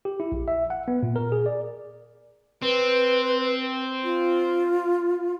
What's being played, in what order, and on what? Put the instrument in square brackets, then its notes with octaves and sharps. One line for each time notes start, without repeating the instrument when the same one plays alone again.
[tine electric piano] G4
E4
A#1
E5
F#5
B3
A#2
A#4
G#4
D5
[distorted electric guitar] C4 [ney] B4
[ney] F4